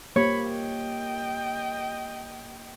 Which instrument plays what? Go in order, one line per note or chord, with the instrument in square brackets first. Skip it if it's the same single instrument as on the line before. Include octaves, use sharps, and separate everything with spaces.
[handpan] A#3 G4 [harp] C#5 [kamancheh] B5
[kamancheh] D#5 G5